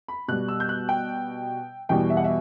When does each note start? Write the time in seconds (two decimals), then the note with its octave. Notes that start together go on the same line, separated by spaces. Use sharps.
0.08 B5
0.28 B2 G3 F#6
0.48 E6
0.60 G6
0.69 F#6
0.89 G5
1.89 E2 B2 G3 G5
2.10 E5
2.17 F#5
2.24 E5